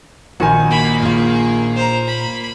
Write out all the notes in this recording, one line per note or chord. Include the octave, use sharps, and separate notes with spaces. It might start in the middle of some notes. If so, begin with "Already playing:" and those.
A#1 D#3 F#4 G#5
A#3 B5
A#2 F4 G#4
C5 A#5
B5